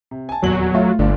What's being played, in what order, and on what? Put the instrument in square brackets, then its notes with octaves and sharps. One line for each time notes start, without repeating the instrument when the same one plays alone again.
[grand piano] C3
G#5 A5
[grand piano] D#1 E2 F#7 [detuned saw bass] F#3
[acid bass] A3 [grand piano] F4
[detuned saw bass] G1 [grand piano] D3 D4 F4